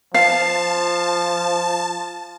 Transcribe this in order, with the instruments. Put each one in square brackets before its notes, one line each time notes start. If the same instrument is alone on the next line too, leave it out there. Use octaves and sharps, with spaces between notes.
[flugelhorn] F3 [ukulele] F5 [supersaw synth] A5